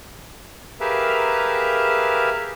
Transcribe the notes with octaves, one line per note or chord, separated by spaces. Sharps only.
G4 G#4 A#4 B4 E5 F5